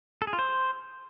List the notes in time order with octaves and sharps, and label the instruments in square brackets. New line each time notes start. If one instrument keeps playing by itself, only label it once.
[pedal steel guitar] A4
G#4
F4
C5